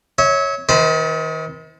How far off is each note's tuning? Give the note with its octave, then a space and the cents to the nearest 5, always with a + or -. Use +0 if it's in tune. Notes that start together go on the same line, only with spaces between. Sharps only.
C#5 +0 E5 -35
D#3 +35 C5 -15 B5 -35